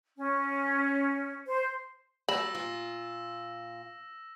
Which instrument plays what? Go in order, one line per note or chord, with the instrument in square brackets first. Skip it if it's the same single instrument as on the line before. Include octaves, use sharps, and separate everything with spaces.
[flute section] C#4
C5
[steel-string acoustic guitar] F#3 G3 [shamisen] B5 [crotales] E6 A#6 E7
[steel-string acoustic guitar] A#2 F4